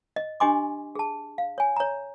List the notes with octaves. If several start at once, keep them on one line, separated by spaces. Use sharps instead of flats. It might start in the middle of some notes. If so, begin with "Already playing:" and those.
D#5
D4 G4 D#5 G#5 C6 D6
G#4 A5
F5
C#5 G#5
C#5 A#5